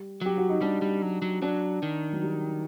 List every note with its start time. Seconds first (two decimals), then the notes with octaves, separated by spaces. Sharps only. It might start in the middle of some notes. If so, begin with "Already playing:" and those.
Already playing: G3
0.21 F#3 G4
0.38 F#4
0.49 D#4
0.61 G3 D4
0.82 G3
1.02 F#3
1.22 F#3
1.42 F#3 D4
1.83 D#3
2.13 F#3
2.22 G3